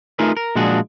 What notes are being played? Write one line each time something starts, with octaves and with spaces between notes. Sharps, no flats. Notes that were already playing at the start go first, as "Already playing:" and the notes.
A3 D#4 F4 G#4 A#4 B4
A#4
A#2 F3 G#3 D4 F#4 G#4